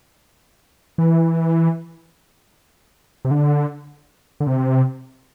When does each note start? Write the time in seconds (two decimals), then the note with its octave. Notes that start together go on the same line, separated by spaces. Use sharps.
0.98 E3
3.25 C3
3.31 D3
4.40 D3
4.47 C3